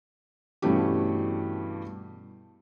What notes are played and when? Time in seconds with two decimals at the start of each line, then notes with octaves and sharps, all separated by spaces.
0.62 G2 B2 E3 A3 C#4 G4